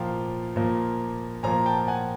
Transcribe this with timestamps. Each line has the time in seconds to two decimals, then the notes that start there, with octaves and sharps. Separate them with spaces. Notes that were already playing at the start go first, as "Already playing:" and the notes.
Already playing: A#2 F3 A#3 F5 G5
0.56 A#2 F3 A#3
1.43 A#2 F3 A#3 G#5 A#5
1.66 G5 A5
1.88 F#5 G#5